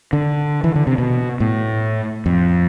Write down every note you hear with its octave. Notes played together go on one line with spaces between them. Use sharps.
D3
E3
D3
C3
B2
A2
F2